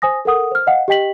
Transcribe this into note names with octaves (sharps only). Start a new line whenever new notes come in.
C5 G#5 D#6 A#6
A4 A#4 F#5 D#6
C5 F6
D#5 F5 F#5
G4 D#5 G5 B6 F#7